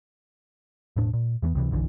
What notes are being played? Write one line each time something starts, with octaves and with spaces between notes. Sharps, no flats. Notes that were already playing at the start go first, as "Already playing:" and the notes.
E1 A2 D4
A#2
E2 E3 A3 B3
C#2 C3 E3
F#1 B1 D3 E3